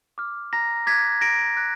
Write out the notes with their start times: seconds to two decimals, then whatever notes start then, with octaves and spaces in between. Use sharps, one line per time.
0.18 D6 F6
0.53 A#5 A#6
0.87 D6 F#6 G#6 B6
1.21 A#5 A#6 D7
1.56 D6 F#6